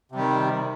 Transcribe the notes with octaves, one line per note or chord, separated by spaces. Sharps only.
C3 D#3 G3